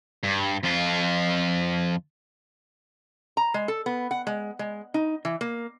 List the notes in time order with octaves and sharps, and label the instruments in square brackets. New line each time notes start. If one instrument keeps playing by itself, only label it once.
[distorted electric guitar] G2
F2 F4
[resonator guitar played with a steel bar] A#5
G#3
A4
B3
F#5
G#3
G#3
D#4
E3
A#3